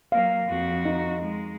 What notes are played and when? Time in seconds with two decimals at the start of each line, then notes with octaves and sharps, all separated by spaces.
0.12 F#3 A#3 F5
0.46 F2 F#4
0.85 D#4
1.22 G#3